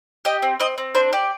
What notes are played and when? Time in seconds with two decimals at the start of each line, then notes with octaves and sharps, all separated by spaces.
0.25 G4 D#5
0.42 C4
0.60 C4 D#5
0.78 C4
0.95 D4 C5
1.13 G4 D5